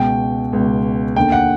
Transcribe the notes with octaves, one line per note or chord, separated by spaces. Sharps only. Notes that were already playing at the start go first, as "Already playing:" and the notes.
Already playing: C#2 B2 G5
C#2 B2
D#2 D3 G5
F#5